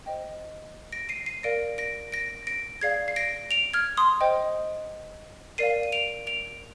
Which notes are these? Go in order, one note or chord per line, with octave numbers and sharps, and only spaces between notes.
C5 D#5 G5
A#6 D7
C7 D#7
C7 D#7
A#4 D5 F5 A#6 D7
A#6 D7
A#6 D7
A#6 D7
G#4 D5 F5 G#6 C7
C7
A#6 D7
D7 F7
F6 G#6
C6 D#6
C5 D#5 G5
A#4 D5 F5 C7 D#7
D#7
D7 F7
D7 F7